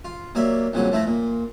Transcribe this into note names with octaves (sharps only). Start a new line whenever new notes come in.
F4
F#3 A#3 G4 D5 E5
C2 A#2 C#3 F#3 F#5
F3 A3 E4 B4 A#5
A#2